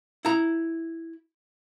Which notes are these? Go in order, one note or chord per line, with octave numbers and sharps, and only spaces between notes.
E4 A#5